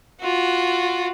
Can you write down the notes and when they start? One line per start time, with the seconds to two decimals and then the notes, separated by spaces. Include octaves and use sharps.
0.21 F4 F#4